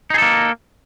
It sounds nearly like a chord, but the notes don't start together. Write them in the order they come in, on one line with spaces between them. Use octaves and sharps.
D#4 G#4 A4 A#3